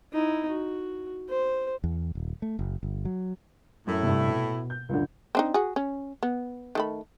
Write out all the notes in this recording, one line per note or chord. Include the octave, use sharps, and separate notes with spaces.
D#4 E4
F#4
C5
E2
D#1
A3
F#1
G1
F#3
F#2 A2 E4
G2 C3
B2
G6
C#2 F#2 D3
C4 D4 D#4
F#4 G#4
C#4
B3
D#3 A3 B5